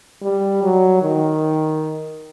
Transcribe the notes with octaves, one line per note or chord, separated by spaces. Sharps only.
G3
F#3
D#3